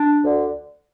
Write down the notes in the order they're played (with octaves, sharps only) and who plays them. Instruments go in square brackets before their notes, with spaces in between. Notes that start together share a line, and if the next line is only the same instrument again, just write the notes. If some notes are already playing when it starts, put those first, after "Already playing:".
Already playing: [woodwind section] D4
D2 D3